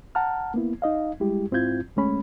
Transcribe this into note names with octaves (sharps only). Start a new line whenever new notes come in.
F#5 A5 A#5 F6
A#3 B3 E4
D#4 D#5 F5
G3 G#3 E4 G4
G#2 C4 E4 F4 G6 G#6
D2 G#3 A3 C#4 B5